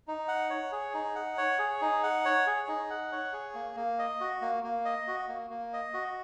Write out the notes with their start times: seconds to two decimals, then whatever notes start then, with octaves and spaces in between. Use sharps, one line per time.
0.08 D#4
0.28 F#5
0.50 C#5
0.72 G#4
0.94 D#4
1.15 F#5
1.38 C#5
1.59 G#4
1.81 D#4
2.03 F#5
2.25 C#5
2.47 G#4
2.68 D#4
2.90 F#5
3.12 C#5
3.33 G#4
3.54 A#3
3.76 A#3
3.99 D#5
4.21 F#4
4.41 A#3
4.64 A#3
4.85 D#5
5.07 F#4
5.28 A#3
5.50 A#3
5.73 D#5
5.94 F#4